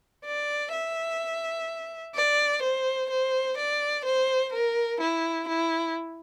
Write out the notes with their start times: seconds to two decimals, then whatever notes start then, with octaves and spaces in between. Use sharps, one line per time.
0.25 D5
0.72 E5
2.15 D5
2.63 C5
3.10 C5
3.58 D5
4.05 C5
4.53 A#4
5.00 E4
5.48 E4